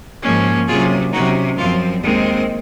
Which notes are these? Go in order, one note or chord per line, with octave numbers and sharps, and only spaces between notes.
G#2 F3 A#3 C#4
C3 F#3 A#3 C#4 F4 G#4
C3 F#3 C#4 D#4 F#4
F#2 F3 C4 F4
D#2 D#3 G#3 C4